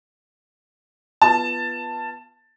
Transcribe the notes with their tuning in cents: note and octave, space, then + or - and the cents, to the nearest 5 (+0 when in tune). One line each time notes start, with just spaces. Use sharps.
B3 -10 F4 -20 A5 +10